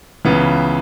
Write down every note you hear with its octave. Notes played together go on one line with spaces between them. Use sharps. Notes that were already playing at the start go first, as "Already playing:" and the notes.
C#2 C#3 E3 B3